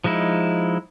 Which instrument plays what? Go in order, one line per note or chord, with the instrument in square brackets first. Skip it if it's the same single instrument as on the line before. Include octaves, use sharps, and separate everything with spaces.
[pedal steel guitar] F3 G#3 D#4 E4